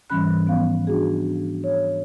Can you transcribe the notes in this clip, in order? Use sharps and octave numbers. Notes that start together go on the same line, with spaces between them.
G#2 E3 G3 C#4 B5 F#6
F3 B3 F5
D4 F#4 G#4
C#5